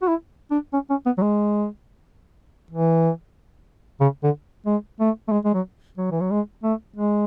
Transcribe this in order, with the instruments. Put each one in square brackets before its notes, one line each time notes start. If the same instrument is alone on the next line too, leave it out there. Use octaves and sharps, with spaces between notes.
[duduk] F#4
E4
D4
C#4
C#4
B3
F#3
G#3
E3
C#3
D3
G#3
A3
A3
G#3
G#3
F#3
F#3
E3
F#3
G#3
A3
G#3